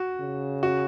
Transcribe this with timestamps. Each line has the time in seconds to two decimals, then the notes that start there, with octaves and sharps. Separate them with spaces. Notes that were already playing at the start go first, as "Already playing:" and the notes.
Already playing: F#4
0.21 C#3
0.63 F#4